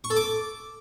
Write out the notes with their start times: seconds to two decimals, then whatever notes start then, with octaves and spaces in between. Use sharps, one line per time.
0.04 C#6
0.10 A4
0.16 D6